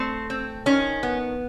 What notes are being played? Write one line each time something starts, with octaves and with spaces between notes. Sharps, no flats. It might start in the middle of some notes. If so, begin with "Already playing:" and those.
Already playing: A3 C4
C4
D#3 C#4
B3